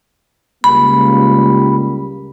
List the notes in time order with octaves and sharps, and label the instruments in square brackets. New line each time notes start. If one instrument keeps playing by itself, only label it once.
[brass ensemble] C#2 G3 A#3 [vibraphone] B5